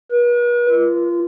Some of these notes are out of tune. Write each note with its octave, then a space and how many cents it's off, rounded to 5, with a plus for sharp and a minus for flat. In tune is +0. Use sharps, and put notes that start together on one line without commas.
B4 -45
F4 -25